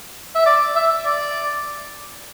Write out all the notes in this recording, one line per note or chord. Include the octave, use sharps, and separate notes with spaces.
E5
D5
E5
D5